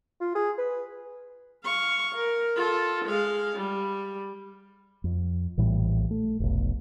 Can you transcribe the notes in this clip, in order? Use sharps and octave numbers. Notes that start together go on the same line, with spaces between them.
F4
G#4
B4
F5 C#6
A#4
F4 A4
G#3 F5
G3
F2
A#1 A2 E3 G3
A3
F1 B1